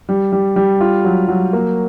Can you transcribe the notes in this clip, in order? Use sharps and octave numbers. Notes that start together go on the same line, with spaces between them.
G3
G3
G3
F4
F#3
F#3
A#3